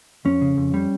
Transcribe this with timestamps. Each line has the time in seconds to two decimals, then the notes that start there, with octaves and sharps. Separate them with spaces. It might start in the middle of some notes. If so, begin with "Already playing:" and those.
0.25 F2 C#4
0.41 C#3
0.57 F2
0.74 G3